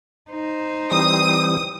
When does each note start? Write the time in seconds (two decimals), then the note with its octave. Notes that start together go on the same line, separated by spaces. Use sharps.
0.31 D#4 C5
0.91 E3 G3 C4 D#6